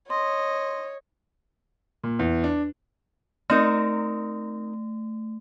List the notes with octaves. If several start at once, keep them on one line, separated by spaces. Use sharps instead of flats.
C#5 D#5 C6
A#2
E2
D4
A3 C4 D#4 A#4